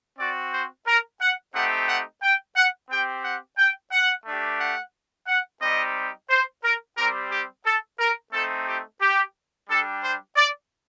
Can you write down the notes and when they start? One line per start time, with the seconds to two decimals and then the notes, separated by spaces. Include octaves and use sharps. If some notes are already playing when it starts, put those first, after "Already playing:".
0.18 C4 F#4 D5
0.53 C5
0.87 A#4
1.21 F#5
1.54 A3 C4 D#4 G4 F#5
1.88 F#5
2.23 G5
2.56 F#5
2.90 C4 G4 G5
3.24 F#5
3.58 G5
3.92 F#5
4.26 A3 D4 G4
4.60 F#5
5.27 F#5
5.62 G3 C4 D#4 G4 D#5
6.30 C5
6.64 A#4
6.97 G3 C4 G4 A#4
7.31 G4
7.65 A4
7.99 A#4
8.33 A3 C4 D#4 A4
8.67 G4
9.01 G4
9.69 G3 D4 G4 A4
10.03 C5
10.36 D5